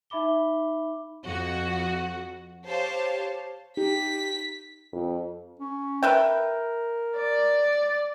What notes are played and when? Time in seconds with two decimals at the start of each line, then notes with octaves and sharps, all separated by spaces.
0.10 D#4 E5 B5 D6 G7
1.25 F2 F#4
2.67 G4 C5 C#5 F5 A5
3.77 D#4 G4 B6
4.93 F2
5.59 C#4
6.03 A#4 B4 E5 G5
7.16 D5